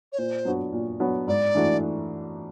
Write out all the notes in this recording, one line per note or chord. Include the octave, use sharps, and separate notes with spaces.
C#5
A#2 C5
F#3 B3 D4 F#4
A#2
F#3 B3 D4 F#4
G#2 D5
E3 A3 D4 F#4